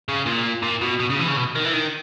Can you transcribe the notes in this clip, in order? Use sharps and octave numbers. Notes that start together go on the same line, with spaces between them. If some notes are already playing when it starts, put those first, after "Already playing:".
C#3
A#2
A#2
B2
B2
C#3
E3
C#3
B2
D#3
E3
D#3